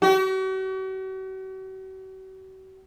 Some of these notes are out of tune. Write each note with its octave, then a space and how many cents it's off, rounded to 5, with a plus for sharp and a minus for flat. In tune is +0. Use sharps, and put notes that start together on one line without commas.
F#4 +45